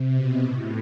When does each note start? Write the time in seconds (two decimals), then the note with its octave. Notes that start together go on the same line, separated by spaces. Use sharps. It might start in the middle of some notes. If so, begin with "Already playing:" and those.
Already playing: C3
0.14 B2
0.42 A2